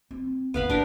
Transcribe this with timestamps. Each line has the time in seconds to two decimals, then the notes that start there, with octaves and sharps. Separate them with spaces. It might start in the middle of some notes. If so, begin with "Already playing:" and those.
0.11 C4
0.54 G#1 E2 B3 F5 B5
0.70 A2 D4 G4 A#4